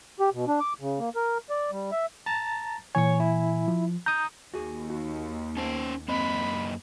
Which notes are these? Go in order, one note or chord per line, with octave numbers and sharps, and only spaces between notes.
G4
B2
D4
D6
C#3
A#3
A#4
D5
G3
E5
A5 A#5 A6
A#2 E3 C#5 G#5 C#6
E4
F3
A#5 D#6 G6
D#2 F#4 G#4
F#4
A#3 C#4 C5 A5
F#2 A#3 C4 D#5 B5